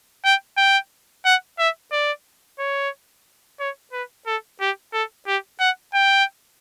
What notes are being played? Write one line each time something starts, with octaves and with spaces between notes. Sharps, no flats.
G5
G5
F#5
E5
D5
C#5
C#5
B4
A4
G4
A4
G4
F#5
G5